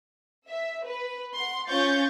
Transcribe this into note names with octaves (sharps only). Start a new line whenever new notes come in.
E5
B4
F#5 C6
C#4 F4 C#5 C#6 G6 A6